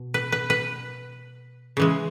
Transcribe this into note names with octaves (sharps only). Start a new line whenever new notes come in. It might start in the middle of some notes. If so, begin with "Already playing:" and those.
Already playing: B2
B4
B4
B4
C#3 E3 G#3